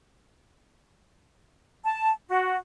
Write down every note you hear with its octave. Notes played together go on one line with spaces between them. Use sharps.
A5
F#4